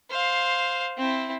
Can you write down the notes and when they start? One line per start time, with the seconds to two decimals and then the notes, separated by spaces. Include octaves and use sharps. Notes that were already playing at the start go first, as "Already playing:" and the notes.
0.10 C5 F5
0.97 C4 E4